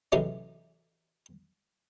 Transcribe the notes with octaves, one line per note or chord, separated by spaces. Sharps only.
A2 C3 E3 F#3 G#3 C#4